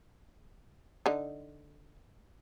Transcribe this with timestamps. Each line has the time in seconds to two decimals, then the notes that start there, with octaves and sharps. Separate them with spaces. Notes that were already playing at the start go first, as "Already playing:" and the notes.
1.06 D3 D#4